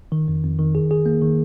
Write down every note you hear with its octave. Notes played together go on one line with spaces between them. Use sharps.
D#3
F2
F2
D#3
G#4
G#4
A#3
D#3